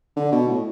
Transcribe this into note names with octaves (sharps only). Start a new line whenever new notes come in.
D3
B2
A2